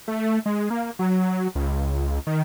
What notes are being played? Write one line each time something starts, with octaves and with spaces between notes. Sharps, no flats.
A3
G#3
A#3
F#3
C#2
D#3